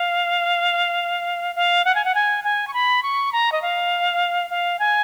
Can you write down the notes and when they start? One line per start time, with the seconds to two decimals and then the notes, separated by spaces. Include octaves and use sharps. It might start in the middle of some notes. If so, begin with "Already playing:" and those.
Already playing: F5
1.56 F5
1.85 F#5
1.95 G#5
2.05 F#5
2.15 G#5
2.44 G#5
2.68 C#6
2.74 B5
3.03 C#6
3.33 A#5
3.52 D#5
3.62 F5
4.50 F5
4.79 G#5